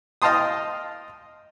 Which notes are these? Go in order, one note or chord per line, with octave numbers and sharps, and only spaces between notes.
D#5 F5 G5 A5 C6 D#6